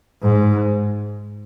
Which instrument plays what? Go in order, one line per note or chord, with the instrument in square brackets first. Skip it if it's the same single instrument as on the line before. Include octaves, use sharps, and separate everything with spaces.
[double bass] G#2